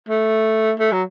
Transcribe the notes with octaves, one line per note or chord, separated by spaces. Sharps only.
A3
A3
F#3